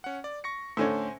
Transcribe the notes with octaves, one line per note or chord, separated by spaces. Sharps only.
C#4 F#5
D5
C#6 A#6 C#7
A2 D3 C#4 C5 G#5